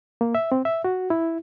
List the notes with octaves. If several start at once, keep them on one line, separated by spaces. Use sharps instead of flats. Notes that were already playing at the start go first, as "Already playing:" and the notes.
A#3
E5
C4
E5
F#4
E4